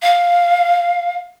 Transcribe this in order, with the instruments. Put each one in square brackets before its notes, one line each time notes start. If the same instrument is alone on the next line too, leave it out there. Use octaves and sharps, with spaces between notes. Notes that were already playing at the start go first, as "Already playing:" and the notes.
[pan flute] F5